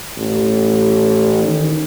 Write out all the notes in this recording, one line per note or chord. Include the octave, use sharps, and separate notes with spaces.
A1
D#3